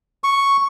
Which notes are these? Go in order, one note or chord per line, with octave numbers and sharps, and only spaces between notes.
C#6